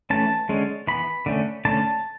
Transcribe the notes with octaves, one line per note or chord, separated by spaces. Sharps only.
E3 A3 C#4 A5
D3 G#3 C#4
E3 B3 B5
D3 A3 C#4
D3 A3 C#4 A5